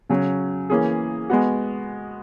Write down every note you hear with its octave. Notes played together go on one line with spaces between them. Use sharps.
C#3 F#3 C#4
E3 A#3 C#4 G#4
G#3 B3 F#4